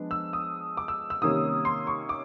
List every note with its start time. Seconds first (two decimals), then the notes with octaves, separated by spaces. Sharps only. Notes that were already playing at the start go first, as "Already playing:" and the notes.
Already playing: F3 G#3 B3 D4
0.11 E6
0.33 D#6
0.77 D6
0.88 E6
1.10 E6
1.22 C3 D#3 G3 A#3 C#4 D#6
1.65 C6
1.87 C#6
2.09 D6